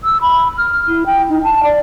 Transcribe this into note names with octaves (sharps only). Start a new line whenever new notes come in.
E6
B5
F6
E4
G5
D#4
A5
D5